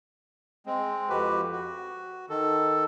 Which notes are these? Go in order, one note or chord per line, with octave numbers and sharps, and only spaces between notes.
G#3 C4
F2 F#4 G4 B4
F#4
D#3 A4